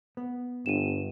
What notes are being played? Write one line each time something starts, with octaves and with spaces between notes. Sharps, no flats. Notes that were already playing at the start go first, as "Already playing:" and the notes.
B3
G1 G2 D#7 E7